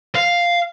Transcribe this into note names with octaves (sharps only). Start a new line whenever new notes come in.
F5